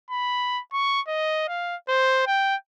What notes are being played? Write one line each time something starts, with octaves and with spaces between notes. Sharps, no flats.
B5
C#6
D#5
F5
C5
G5